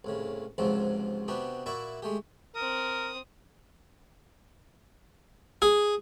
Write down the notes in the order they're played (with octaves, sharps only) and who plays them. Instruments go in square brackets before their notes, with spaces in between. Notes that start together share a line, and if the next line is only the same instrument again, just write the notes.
[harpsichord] C2 A2 C#3
C#2 G#2 C3 F3 F#3 C4
C3 B3 D4 F#4 G4
A#2 E4 F#4 D5 E5 C#6
G#3 A3 G4
[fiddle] C4 D#6 [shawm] A#4
[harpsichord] G#4